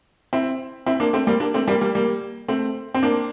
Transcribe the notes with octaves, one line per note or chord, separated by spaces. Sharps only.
C4 E4
C4 E4
A#3 D4
A3 C4
G3 A#3
A#3 D4
A3 C4
G3 A#3
G3 A#3
G3 A#3
A3 C4
C4
A#3 D4